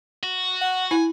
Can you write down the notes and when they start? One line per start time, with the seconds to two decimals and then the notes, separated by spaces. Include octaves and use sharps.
0.23 F#4
0.61 F#5
0.91 E4 G#5